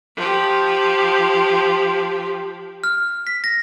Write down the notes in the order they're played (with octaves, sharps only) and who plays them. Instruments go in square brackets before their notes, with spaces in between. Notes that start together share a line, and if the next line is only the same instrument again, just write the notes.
[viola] F3 G4
[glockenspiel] F6
B6
A#6